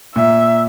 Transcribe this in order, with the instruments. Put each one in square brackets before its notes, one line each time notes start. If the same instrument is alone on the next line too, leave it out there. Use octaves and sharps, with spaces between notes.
[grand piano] A#2 [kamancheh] E5